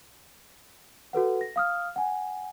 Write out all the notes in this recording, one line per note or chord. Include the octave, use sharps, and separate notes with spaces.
F#4 A4 B4 F#5
A#6
F5 D#6 F6
F#5 G#5